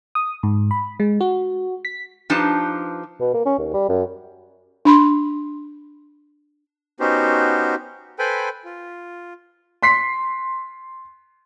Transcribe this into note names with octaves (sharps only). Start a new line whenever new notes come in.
D#6
G#2
B5
G#3
F#4
B6
F3 D4 D#4 G4 B4 A5
B2
A#3
C#4
D#2
G3
F#2
D4 B5 C6
B3 C#4 D#4 F#4 G4 C5
A4 B4 C5 G5 G#5 B5
F4
C6 B6 C7